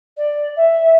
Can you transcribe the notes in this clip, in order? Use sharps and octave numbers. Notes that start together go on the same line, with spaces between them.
D5
E5